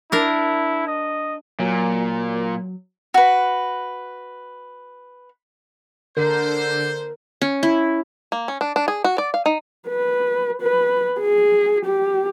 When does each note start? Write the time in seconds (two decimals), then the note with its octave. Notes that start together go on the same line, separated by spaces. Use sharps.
0.12 D4 E4 A#4
0.88 D#5
1.60 A#2 F#3
3.14 F#4 B4
6.17 D3 A#4 C5
7.42 C#4
7.63 E4
8.32 A#3
8.48 C#4
8.61 D4
8.76 D4
8.88 G#4
9.04 F#4
9.18 D5
9.34 F5
9.46 D#4
9.88 B4
10.62 B4
11.20 G#4
11.85 G4